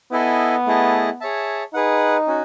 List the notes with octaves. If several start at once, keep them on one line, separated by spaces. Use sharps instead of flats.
B3 E4 A4 D#5 G#5
A3 E4 G#4 D#5 A5
G#4 C#5 E5 A5
D#4 G#4 B4 F#5
C#4 F#4